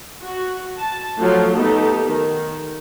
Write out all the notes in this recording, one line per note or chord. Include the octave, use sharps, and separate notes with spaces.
F#4
A5
F3 F#3 A3 F4
A3 B3 D#4 G4 A4
D#3